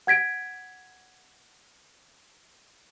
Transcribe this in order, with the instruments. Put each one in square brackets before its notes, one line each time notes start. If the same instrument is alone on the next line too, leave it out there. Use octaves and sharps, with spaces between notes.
[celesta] F#5 G#6 B6 D7